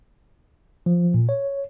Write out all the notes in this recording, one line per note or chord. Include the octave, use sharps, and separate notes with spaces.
F3
A#2
C#5